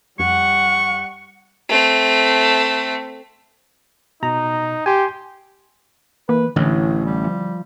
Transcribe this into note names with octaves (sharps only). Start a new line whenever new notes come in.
F2 G3 F#5 C#6
A3 C4
B2 D#4 A#5
G4 G#5 C6
E3 A#3 B4
A1 A2 D3 E3
G3
F3